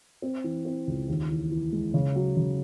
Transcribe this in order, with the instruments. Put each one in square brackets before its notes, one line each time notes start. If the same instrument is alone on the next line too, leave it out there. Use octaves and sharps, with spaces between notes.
[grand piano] C4
E3
C4
C#2
D#2
E3
E3
G#3
C#3
F#3
C#3